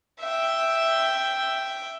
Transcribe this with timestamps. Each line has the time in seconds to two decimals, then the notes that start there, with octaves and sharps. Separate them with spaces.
0.21 E5 G5